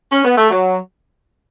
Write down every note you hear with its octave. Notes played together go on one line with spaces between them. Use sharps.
C#4
B3
A3
F#3